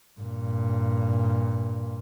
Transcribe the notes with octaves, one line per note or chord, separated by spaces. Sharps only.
G2 A#2